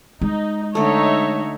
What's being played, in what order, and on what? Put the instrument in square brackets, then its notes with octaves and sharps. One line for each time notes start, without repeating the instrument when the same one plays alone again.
[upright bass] G#3 [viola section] D#4
[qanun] D3 A3 [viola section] D#4 C#5 E5